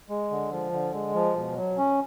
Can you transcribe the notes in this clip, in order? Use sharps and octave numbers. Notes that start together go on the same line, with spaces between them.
G#3
D3
F3
D3
G#3
F3
B2
F#3
C#4